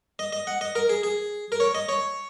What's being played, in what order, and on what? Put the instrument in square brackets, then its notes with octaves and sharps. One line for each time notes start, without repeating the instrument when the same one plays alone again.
[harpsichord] D#5
D#5
F#5
D#5
A#4
G#4
G#4
A#4
C#5
D#5
C#5